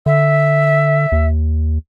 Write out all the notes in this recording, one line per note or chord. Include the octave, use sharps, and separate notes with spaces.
D3 E5
D#2